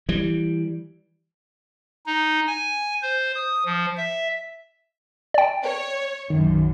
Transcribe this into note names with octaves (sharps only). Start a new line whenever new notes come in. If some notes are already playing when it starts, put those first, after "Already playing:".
E3 G3
D#4
G#5
C5
D#6
F3
E5
D5 G5
C#5
B1 F#2 D#3